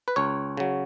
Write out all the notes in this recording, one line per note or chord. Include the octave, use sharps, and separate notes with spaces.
B4
C#2 C#5
C#3 F#3